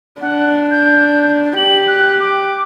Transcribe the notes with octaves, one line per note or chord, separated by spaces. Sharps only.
D4 F#5
G6
G4 F#7
F#6
D6